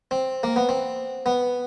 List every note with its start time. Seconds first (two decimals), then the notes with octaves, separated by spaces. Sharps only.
0.11 C4
0.43 A#3
0.56 B3
0.69 C4
1.26 B3